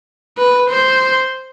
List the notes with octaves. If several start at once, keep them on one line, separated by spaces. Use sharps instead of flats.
B4
C5